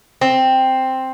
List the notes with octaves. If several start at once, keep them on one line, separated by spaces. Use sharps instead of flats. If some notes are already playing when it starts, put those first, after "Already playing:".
C4